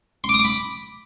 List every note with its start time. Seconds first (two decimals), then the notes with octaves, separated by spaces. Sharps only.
0.24 C6
0.29 D6
0.34 D#6
0.39 D6
0.44 B5